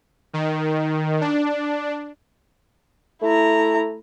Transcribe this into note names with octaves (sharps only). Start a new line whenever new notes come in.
D#3
D4
A3 E4 A#5